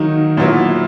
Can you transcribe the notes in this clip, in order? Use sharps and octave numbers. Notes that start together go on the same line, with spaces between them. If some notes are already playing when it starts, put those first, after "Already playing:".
Already playing: D#3 F#3 A#3 D#4
A#2 F#3 B3 E4